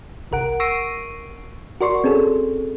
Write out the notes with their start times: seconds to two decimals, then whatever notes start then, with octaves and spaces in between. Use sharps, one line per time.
0.31 G1 C2 A#4 F#5 D7
0.60 C#6 E6 A#6 C7 D7 D#7
1.81 F#4 A#4 D5 C6 C#6
2.04 C4 C#4 G#4 A4